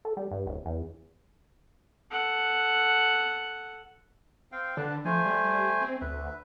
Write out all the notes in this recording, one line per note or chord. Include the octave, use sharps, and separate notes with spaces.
A4
G3
G2
D1
E2
A4 F#5
C4 F5 G5
D3 D4 B4 A5
F3 A3 C5 G#5
G3
C4
D2 B4 E5